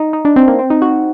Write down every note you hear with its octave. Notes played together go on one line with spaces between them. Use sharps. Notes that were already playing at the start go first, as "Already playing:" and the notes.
Already playing: D#4
D#4
D4
C4
A#3
C4
D#4
F#4